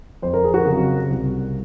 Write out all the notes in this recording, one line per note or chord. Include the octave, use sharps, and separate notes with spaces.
F2 C5
A#4
G#4
F#4 A#4
C#3 F#3 C4
C2